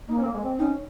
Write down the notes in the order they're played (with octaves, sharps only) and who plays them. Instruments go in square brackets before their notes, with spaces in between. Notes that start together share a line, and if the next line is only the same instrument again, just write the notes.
[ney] A#3 [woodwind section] D#4
[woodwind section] C4 C#4
A#3
G#3
C4
[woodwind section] C#4 [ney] D#4